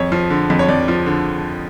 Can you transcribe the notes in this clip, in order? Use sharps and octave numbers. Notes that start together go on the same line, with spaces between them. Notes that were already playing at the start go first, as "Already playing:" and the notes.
Already playing: F2 C#5
F3
D3
F2
C#5
F2 D5
F3
D3